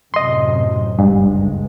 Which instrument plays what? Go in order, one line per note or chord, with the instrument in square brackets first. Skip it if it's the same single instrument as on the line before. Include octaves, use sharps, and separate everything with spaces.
[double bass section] F#2 A2 C3 [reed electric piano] D#5 C6
[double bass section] F#1 C#2 G#3 [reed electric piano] G2